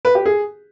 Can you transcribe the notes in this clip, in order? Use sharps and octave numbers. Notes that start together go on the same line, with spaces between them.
B4
G4
G#4